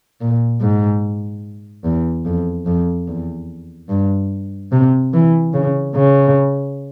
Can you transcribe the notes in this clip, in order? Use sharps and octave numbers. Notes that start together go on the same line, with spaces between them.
A#2
G#2
E2
F2
F2
E2
G2
C3
E3
C#3
C#3